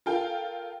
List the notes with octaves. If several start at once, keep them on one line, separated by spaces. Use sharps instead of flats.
F4 A4 A#4 F5 G5